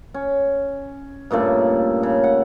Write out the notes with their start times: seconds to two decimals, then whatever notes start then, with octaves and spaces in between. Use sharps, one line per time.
0.14 C#4
1.31 G2 A#2 C#3 A3
2.03 C#3
2.24 F#5